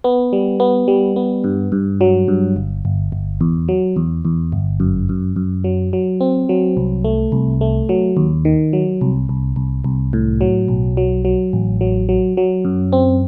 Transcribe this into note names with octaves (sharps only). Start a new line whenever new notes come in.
B3
G3
B3
G3
B3
G2
G2
F#3
G2
G1
G1
G1
E2
F#3
E2
E2
G1
F#2
F#2
F#2
F#3
F#3
C4
F#3
C2
A3
C2
A3
F#3
D#2
D#3
F#3
C2
C2
C2
C2
A2
F#3
B1
F#3
F#3
A1
F#3
F#3
F#3
F#2
C4